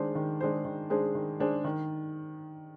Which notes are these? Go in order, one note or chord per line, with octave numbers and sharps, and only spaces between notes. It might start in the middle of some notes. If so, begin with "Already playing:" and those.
Already playing: D#3 G#3 D4 G#4 C5
D#3
G#3 D4 G#4 C5
D#3
G#3 D4 G#4 C5
D#3
G#3 D4 G#4 C5
D#3